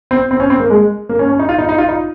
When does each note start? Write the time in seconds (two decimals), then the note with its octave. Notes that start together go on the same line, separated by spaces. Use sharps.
0.11 C4
0.31 C4
0.40 C#4
0.50 C4
0.60 A#3
0.70 G#3
1.09 A#3
1.19 C#4
1.29 C#4
1.39 D#4
1.49 F4
1.58 D#4
1.69 D#4
1.78 F4
1.89 D#4